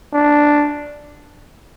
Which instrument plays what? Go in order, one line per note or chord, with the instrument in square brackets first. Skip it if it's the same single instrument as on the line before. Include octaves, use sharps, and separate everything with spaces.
[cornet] D4